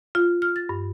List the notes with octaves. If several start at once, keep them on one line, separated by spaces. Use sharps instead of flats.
F4
F6
A6
G2